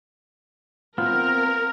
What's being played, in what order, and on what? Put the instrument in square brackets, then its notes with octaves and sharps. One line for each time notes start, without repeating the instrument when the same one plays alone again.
[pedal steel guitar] B3 C4 [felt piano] F4 [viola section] A#4 [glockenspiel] F6